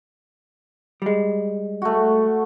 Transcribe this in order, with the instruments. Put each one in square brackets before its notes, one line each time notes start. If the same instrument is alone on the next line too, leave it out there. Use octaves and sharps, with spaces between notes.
[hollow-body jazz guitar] G3 G#3
[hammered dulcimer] A3 F#4